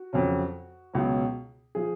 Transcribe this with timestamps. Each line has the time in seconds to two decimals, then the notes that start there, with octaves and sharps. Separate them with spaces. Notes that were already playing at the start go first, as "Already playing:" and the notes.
Already playing: F#4
0.13 F2 C#3 F#3
0.94 C#2 B2 F#3
1.75 F3 G#4